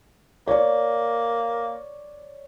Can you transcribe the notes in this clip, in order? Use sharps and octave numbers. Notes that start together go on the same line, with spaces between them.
A#3 C#5 D5